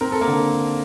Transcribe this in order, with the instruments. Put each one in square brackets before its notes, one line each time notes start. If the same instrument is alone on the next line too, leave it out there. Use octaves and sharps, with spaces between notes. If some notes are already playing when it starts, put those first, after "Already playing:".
[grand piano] C4 [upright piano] A#4
[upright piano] A4
A#3 A#4
[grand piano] D3